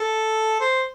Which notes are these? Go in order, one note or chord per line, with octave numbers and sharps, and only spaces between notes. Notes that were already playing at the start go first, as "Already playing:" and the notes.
Already playing: A4
C5